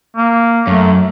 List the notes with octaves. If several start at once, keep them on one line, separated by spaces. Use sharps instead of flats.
A#3
F#2 A3